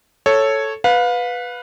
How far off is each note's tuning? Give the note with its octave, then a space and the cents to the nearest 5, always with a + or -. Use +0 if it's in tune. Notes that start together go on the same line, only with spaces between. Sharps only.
A4 +0 C#5 -5
B4 +0 F5 +30